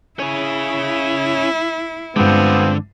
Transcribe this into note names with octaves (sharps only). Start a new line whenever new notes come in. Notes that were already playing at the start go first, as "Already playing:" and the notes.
C#4 E4 G#4
G2 D3 F3 G#3 B3 C4